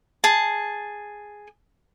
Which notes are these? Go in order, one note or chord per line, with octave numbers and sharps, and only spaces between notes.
G#4 A5